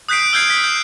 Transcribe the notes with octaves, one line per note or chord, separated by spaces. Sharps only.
D#6 F#6 G6 B6 C7 D7
E6 F6 G6 G#6 C7 D7
B6
G6